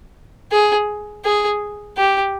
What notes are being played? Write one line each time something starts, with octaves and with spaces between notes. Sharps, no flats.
G#4
G#4
G4